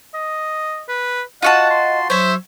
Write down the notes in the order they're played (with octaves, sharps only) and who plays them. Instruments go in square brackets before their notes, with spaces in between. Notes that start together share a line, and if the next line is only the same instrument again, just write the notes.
[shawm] D#5
B4
[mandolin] F4 F#4 A5 [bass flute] D#5 [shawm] F#5
[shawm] C6
[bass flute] F#3 [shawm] C5 [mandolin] C#5 E5